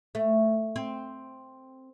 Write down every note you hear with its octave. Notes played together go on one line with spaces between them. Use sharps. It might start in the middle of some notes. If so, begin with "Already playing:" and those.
A3
C4